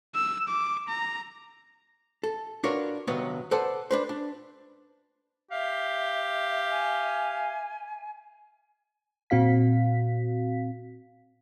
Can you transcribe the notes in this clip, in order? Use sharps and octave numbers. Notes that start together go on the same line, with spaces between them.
E6
D6
A#5
A4
D4 F4 F#4 A#4 B4 C#5
G2 C3 D#3 F#3 B3
A4 B4 C5 D5 F#5 A5
D4 B4 C5
D4
G4 E5 F5
G#5
A#2 C4 F#4 F5 B6